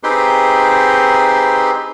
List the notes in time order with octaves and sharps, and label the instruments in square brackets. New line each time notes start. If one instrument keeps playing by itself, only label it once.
[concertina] C4 D#4 G4 G#4 B4 C6